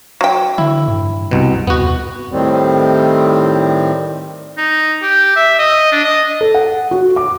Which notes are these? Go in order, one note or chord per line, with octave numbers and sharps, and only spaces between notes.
F#3 G5
D3 E4
G2
C2 B2
D#2 B3 F#4
A2 D#3 G3 C4
D#4
G4
E5
D#5
D4
D#5
A4
F#5
F#4
D6